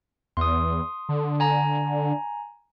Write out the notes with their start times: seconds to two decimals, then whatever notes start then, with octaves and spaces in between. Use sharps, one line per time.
0.37 E2 C6 D#6
1.09 D3
1.40 G#5 A#5